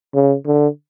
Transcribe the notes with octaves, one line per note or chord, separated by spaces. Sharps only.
C#3
D3